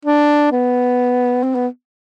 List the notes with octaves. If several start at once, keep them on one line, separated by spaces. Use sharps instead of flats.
D4
B3
C4
B3